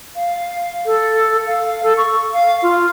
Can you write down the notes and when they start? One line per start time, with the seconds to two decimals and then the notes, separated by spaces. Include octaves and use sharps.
0.16 F5
0.86 A4
1.47 F5
1.83 A4
1.97 C#6
2.33 F5
2.62 F4